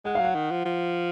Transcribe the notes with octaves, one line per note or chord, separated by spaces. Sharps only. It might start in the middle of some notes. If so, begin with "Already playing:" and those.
G#3 F#5
F#3 F5
F#5
D#3
F3
F3